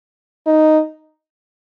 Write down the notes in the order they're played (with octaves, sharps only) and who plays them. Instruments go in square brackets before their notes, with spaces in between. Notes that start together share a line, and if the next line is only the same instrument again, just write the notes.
[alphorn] D#4